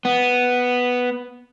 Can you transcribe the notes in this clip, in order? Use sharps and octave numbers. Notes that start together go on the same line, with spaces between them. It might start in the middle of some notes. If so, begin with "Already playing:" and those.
B3